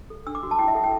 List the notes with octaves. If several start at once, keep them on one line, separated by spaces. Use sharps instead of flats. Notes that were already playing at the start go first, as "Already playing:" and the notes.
A4
D4 E6
D6
F#4
A5
E4 G5
E5
A4 F#5
G5